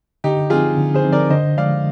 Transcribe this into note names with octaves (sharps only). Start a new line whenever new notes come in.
D3 D#4 G4
F3 C4 D#4 F4 G#4
D3
G#4 C5
F3 C4 D#4
A#4 D5
D3 C5 D#5
F3 G#3 D5 F5